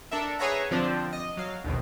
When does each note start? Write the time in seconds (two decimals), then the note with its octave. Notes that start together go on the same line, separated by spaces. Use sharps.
0.11 D4 A4 A#4 E5
0.39 G#4 B4 C#5 E5 F#5 A#5
0.71 D3 F3 C4 D4
1.13 D#5
1.37 F#3 F5
1.64 A#1 D#2 B2